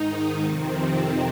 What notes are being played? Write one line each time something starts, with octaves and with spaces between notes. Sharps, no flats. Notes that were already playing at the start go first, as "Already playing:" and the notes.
Already playing: G#2 D#3 D#4
F2 C3 D#3 C4
F2 C3 D#3